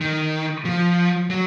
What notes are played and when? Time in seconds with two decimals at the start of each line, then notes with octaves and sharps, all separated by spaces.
0.01 D#3
0.65 F3
1.30 F#3